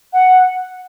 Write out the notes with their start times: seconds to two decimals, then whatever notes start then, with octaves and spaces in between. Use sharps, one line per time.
0.13 F#5